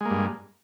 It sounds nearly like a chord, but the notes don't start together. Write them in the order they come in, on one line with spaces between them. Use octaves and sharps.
G#3 A#3 G2